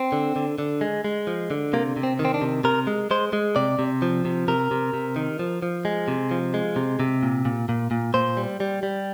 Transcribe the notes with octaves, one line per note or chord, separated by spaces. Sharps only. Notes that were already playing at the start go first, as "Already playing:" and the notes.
Already playing: C4
D3
D3
D3
G#3
G#3
F3
D3
C3 A#3
C3
C4
D#3
C4
D4
C3
C3 A#4
G#3
G#3 C5
G#3
C3 D5
C3
F3
C3
C3 A#4
C3
C3
D#3
F3
F3
G#3
C3
F3
G#3
C3
C3
A#2
A#2
A#2
A#2
A#2 C5
G3
G3
G3